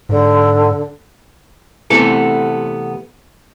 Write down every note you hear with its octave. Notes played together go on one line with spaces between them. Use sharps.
G#2 D3
C3 E3 A3 B3 A4